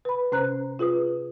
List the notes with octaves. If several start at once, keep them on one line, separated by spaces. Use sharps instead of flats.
B4 B5
C3 C#4 C5 A#5 F#6
F4 G#4 B4 D#6